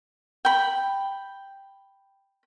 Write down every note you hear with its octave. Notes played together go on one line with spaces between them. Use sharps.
G5 B5